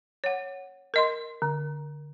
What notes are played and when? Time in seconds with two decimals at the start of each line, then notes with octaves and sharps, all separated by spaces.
0.24 C#5 F#5
0.94 A#4 D#5 C6
1.42 D3